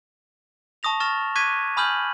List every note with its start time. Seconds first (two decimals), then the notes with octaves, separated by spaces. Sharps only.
0.83 A5 C#6 D#6 A#6 F7
1.00 C#6 F6 A6 A#6 E7
1.35 C#6 D6 F#6 G#6 B6 D#7
1.77 G#5 B5 D#6 F6 G6 F#7